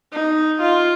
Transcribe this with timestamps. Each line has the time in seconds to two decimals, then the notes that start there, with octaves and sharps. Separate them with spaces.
0.12 D#4
0.60 F4